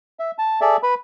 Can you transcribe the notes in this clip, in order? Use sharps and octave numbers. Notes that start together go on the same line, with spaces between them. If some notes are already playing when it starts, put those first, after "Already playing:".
E5
A5
G#4 A4 D5 E5
B4 B5